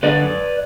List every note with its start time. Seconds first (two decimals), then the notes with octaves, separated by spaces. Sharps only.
0.03 D3 B4 D5
0.23 F#2